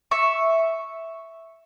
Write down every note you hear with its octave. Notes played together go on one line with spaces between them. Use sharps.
E5 C#6